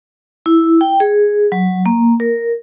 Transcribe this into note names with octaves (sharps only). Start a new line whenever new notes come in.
E4
G5
G#4
F#3
A#3
A#4